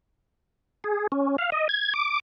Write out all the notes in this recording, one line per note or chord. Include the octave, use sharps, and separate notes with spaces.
G#4
C#4
F5
D#5
G#6
D6